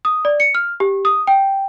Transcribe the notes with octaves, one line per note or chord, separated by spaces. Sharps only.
D#6
D5
C#7
F6
G4
D#6
G5